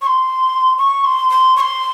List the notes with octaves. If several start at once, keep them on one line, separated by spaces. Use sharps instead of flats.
C#6
C6
C#6
C6
C6
C#6
C6